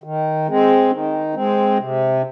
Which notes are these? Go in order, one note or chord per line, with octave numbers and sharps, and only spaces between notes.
D#3
G#3 C4
D#3
G#3 C4
C3